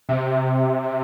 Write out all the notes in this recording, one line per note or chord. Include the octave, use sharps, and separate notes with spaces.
C3